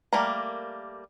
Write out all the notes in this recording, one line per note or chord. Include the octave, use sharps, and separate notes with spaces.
G3 A3 A#3 A#4 A#5